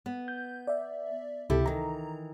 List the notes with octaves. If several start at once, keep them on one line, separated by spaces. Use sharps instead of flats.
B3
G6
D5 E5
C#2 C3 E4 G4 A4
D#3 E3 A#5